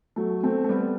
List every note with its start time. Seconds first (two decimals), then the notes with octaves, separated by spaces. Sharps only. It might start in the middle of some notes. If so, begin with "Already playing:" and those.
0.16 F#3 A3
0.43 A3 C4
0.64 A3
0.69 G3 B3